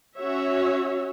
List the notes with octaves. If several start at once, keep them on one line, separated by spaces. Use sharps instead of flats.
C#4 F#4 C#5 E5